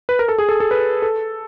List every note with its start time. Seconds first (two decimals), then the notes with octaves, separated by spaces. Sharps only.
0.09 B4
0.19 A#4
0.28 A4
0.38 G#4
0.49 A4
0.60 A4
0.71 B4
1.02 A4